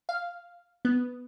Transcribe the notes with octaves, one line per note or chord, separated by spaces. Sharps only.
F5
B3